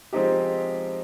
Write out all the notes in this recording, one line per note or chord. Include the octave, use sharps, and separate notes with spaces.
F3 G#3 C4 D#4 G4